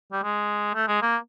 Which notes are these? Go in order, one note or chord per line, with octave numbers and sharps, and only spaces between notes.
G3
G#3
A3
G#3
A#3